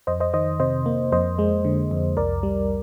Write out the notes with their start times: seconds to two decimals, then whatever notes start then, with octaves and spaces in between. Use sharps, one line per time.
0.07 F2 C5 D#5
0.20 C5 D#5
0.34 D#3 C5 D#5
0.60 C3 C5 D#5
0.86 A#3
1.12 F2 C5 D#5
1.39 G#3
1.65 D3
1.91 F2
2.17 C2 A#4 D5
2.43 G3